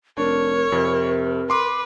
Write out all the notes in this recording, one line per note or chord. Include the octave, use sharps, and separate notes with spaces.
F1 D4 A#4 C#5
F2 C3
B4 C6 D6